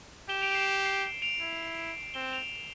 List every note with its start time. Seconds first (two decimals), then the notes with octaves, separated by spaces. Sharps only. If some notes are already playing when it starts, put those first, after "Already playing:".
0.29 G4 E7 G7
0.41 D7 F7
0.54 C7 E7
0.86 C7
1.22 D7 F7
1.40 E4
2.14 C4 E7 G7
2.33 D7 F7